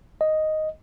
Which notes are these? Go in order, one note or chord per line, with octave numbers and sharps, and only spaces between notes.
D#5